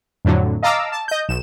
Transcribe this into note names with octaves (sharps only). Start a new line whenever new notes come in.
F2 A2 D3 F#3
D#5 F5 A5 A#5 D6 E6
A5
D#5 G6
B1 E7